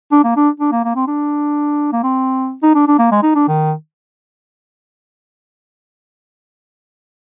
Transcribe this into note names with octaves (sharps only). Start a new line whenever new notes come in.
D4
A#3
D4
D4
A#3
A#3
C4
D4
A#3
C4
D#4
D4
D4
A#3
G#3
D#4
D4
D#3